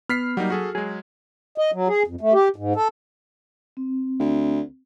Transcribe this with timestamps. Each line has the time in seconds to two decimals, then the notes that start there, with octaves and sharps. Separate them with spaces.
0.09 B3 F6 B6 C7
0.37 F#3 G3 A#3 D#4
0.50 F#4 G#4 A4
0.75 F#3 G#3 G#4
1.58 D#5
1.73 F#3
1.88 G#4
2.07 F2
2.21 A3
2.33 G4
2.56 G#2
2.76 A4
3.77 C4
4.20 D2